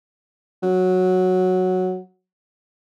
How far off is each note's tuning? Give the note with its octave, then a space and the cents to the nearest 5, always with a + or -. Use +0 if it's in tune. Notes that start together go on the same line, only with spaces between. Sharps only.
F#3 -5